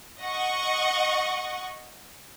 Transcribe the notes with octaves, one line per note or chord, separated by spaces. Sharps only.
D#5 F#5 C#6